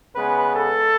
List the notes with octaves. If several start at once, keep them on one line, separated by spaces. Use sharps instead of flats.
C#3 G#3 B3 B4
A4